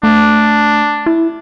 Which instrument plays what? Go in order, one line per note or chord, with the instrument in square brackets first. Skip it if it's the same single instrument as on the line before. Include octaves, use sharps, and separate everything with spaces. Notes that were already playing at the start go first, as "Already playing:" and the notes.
[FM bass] A3 [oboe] D4
[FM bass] E4